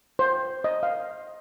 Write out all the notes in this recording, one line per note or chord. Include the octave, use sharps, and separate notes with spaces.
C5
D#5
F5